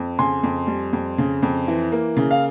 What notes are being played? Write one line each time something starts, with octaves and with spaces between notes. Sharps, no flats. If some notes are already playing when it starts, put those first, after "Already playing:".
Already playing: F2
C#3 G#5 C6
F2
G3
F2
C#3
F2
E3
A#3
C#3
F5